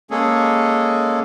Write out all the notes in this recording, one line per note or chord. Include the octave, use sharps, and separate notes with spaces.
G#3 A#3 C#4 G#4 A4